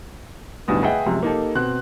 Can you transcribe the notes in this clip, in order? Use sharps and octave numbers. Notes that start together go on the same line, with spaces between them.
D1 B1 G2 B2 D#6
G#4 B4 D#5 E5 F#5 G5
F#2 C3 F3 G#3
A#3 D#4 G4 A4
B2 C4 F#6